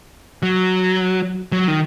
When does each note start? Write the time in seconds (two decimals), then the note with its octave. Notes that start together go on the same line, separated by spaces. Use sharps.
0.43 F#3
1.52 F#3
1.68 D#3